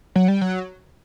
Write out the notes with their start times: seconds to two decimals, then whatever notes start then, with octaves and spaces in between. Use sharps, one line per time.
0.16 F#3
0.28 G3
0.41 F#3